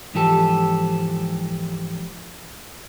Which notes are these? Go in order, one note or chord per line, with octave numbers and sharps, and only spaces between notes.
G#2 E3 F3 G4 A4